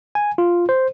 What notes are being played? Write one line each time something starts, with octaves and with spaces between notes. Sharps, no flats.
G#5
F4
C5